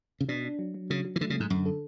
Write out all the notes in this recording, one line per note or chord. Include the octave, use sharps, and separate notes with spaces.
C#3
B2 D4
D4
F#3
F#3
C#3 F#3
F#3
E3
D3 A3
C#3
G#2 A3
F#2 D3
A4